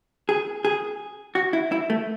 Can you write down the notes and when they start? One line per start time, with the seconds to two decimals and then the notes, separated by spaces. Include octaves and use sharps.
0.29 G#4
0.65 G#4
1.35 F#4
1.53 E4
1.72 E4
1.90 A3